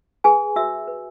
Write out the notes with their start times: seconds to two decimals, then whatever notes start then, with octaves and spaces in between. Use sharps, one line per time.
0.24 G#4 B4 G#5
0.56 F#4 E5 E6
0.87 B4